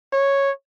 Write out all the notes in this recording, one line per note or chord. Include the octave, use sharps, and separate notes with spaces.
C#5